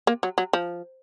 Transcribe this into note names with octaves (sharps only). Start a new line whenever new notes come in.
A#3
F#3
F#3
F3